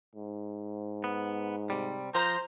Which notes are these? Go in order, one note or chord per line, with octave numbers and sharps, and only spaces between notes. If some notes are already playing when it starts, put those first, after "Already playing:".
G#2
B3
C3 G3
F3 C5 A#5